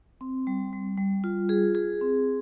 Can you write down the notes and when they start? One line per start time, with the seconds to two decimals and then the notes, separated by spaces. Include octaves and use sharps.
0.21 C4
0.47 G3
0.73 G3
0.98 G3
1.24 F4
1.49 G#4
1.75 G#4
2.01 C4